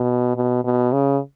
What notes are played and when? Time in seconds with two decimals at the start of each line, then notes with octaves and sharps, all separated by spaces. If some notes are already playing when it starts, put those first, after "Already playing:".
Already playing: B2
0.36 B2
0.65 B2
0.93 C#3